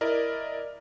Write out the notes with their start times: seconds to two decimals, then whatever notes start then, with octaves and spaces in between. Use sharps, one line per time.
0.01 E4 A#4 D5 D#5